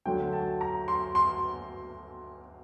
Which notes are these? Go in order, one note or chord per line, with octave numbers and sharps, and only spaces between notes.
D2 D3 F#3 G5
A5
A#5
C6
C6